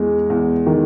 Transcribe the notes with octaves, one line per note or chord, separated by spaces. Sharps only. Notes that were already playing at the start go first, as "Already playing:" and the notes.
Already playing: E2 G#3
E2
D#3